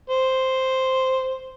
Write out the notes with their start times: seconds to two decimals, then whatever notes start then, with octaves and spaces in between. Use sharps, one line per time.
0.10 C5